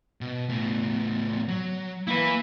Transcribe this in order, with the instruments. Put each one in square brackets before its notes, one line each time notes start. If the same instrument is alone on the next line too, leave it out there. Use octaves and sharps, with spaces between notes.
[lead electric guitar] B2
A2 B3
F#3
[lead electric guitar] A#3 F5 [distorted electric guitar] E4 B4